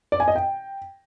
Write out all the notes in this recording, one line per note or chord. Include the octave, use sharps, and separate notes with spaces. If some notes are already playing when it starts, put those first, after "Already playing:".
D5
G#5
D#5
G5